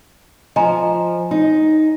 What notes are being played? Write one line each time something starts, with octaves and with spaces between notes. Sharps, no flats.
F3 D#5 G#5 A#5
D#4